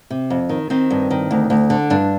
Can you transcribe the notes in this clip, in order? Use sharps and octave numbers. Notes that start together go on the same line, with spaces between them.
C3
F2
D#3
D#3 C4
G2
D#3
D2
D2
D3
G2 D4